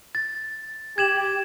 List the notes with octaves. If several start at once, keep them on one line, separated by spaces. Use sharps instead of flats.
A6
G4 G#6 E7 F#7